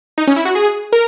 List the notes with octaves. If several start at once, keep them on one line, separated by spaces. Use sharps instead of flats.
D#4
C#4
E4
F#4
G#4
A#4